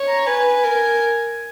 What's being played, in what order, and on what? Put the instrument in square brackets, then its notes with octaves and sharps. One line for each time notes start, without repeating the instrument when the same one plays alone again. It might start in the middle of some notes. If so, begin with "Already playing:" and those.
Already playing: [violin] C#5
[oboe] A#5
[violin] B4 [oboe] G#5
[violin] A#4